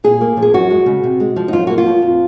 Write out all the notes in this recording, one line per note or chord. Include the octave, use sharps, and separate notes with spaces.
A#2 G#4
A#3
F3
G#4
F#2 F#4
G#3
C#3
C3
G#3
F3
D#4
F#2 F4
A#3 F#4
F4
F3
F2